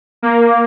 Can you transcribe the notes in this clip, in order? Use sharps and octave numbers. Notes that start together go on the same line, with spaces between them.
A#3